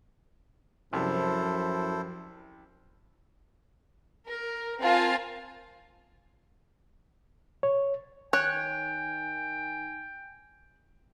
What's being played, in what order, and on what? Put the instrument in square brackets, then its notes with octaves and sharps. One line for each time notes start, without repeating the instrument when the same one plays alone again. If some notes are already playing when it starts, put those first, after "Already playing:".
[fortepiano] C2 [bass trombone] F#2 [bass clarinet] F3 [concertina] E4 A4 C5
[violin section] A#4
C4 F4 A#4 F5 G#5 A5
[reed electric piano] C#5
[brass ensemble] D#3 G#5 [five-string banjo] C#5 [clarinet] G5 [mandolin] F#6